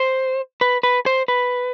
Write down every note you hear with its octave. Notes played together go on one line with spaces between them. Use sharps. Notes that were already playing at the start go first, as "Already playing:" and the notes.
Already playing: C5
B4
B4
C5
B4